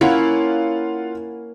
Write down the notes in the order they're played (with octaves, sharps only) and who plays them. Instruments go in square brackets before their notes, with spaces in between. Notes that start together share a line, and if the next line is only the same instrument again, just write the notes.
[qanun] A#3 C#4 E4 [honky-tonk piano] F4 F#5